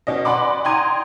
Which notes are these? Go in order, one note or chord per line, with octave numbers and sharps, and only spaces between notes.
B2 C#4 D#5
D5 F#5 G#5 B5 C6 D6
G5 A#5 C6 D#6 G#6 D#7